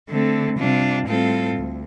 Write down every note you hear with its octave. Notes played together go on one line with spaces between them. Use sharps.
D3 A3 C4
C3 G3 D4 F4
A2 G3 C4 F4 A4
D2